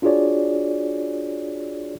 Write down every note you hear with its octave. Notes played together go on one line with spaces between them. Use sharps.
D4 F4 F#4 G#4 C#5 D5